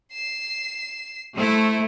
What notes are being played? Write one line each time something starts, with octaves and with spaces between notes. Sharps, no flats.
C7 E7
A3 E4 C5